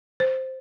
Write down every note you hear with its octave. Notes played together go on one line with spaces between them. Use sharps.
C5